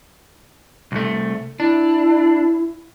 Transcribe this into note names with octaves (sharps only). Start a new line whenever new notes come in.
C2 A3
D4 E4